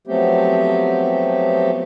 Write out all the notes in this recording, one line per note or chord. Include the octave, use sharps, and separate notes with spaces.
F3 F#3 A3 B3 C4 G4